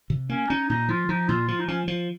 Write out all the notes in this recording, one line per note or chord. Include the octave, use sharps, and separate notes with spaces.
C3
A#3 C#4
C#4 D#4
A#2 D#4
F3 F4
F3 D#4
A#2 F4
F3 F4
D#4
F3 C#4
F3